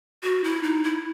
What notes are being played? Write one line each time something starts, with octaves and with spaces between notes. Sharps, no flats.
F#4
E4
D#4
E4